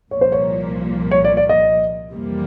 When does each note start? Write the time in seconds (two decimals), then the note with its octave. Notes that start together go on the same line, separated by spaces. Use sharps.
0.11 C2 A#2 F3 A#3 C#5
0.21 C5
0.32 C#5
1.11 C#5
1.25 D5
1.37 D5
1.49 D#5
2.12 F2 C3 E3 G3 A#3